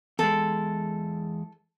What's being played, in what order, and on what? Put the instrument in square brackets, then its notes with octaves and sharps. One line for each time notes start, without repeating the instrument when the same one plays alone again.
[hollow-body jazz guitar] E2 G#3 [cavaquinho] A4